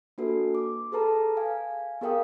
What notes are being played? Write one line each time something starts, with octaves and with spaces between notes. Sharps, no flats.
A#3 D4 F#4 A4 B4
D6
G#4 A4 B4 A5 A#5
F5 G#5
B3 G#4 A#4 F5 G5 D#6